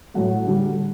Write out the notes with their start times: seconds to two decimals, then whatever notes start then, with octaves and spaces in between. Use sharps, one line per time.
0.14 A2 F#3 A3 F#5
0.47 D3 G3